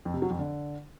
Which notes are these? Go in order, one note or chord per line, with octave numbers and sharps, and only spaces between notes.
F2
C3
F#3
F2
D3